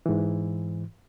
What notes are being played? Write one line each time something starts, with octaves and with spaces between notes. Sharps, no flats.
G#2 E3